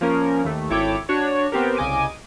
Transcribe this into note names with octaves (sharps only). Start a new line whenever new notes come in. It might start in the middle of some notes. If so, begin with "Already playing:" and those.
F3 A#3 C#4 A#4
D#2 A3
G#1 E4 A4 C#5 G5 D6
D4 F#4 C#5
B3 C4 G4 A#4
C2 C#3 D#5 G#5 D6 D#7